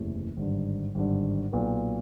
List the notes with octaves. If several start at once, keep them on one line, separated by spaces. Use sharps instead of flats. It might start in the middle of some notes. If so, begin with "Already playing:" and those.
Already playing: F#1 E2 C3 E3 A3
G#1 G2 D3
G#1 G2 D3
B1 A#2 F#3 B3